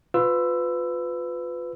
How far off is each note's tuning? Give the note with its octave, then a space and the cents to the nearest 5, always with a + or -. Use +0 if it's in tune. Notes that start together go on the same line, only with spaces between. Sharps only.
F4 +20 B4 +20 E6 +10